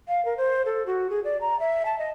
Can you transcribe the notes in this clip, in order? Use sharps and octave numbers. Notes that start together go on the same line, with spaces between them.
F5
A#4
C5
A4
F#4
G#4
D5
A#5
E5
A5
D#5